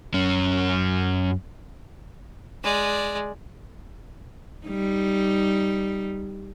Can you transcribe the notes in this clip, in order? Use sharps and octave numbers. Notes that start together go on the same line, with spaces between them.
F#2 C#4
G#3 D5
G3 D#4